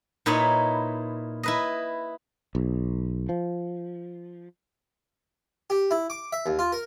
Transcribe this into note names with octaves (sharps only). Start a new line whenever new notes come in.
A#2 D#4 E4 B4 C#5 B5
E4 B4 D#5
B1
F3
G4
E4
D6
E5
D#2
F4
A#4